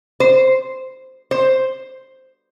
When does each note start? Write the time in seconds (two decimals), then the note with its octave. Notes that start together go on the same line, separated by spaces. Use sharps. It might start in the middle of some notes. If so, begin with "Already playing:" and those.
0.20 C5
1.31 C5